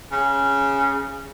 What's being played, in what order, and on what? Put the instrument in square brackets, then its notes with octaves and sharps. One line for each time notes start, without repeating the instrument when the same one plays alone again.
[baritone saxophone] C#3